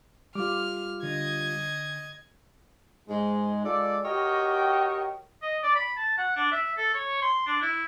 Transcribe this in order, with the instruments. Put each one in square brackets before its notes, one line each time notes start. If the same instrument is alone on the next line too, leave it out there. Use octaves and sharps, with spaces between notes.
[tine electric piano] G3 F4 [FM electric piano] D6 [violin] F6
[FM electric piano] D3 [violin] D#5 G#6
[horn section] G#2 G#3
G#3 F4 A4 D5
F#4 G4 A#4 C#5 D#5 G5
[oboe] D#5
D5
B5
A5
F#5
D4
E5
A4
C#5
C6
D4
E4